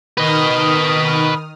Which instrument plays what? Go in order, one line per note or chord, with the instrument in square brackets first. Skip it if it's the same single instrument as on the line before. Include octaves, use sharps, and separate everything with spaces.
[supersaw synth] D#3 D#6 F6 [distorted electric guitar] B4 D#5